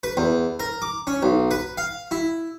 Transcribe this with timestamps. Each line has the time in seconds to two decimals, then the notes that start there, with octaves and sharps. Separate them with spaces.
0.03 B4
0.17 E2
0.60 A#4
0.82 D6
1.07 C#4
1.23 B1
1.51 B4
1.77 F5
2.11 E4